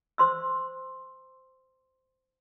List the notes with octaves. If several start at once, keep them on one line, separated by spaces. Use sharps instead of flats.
C5 C6 E6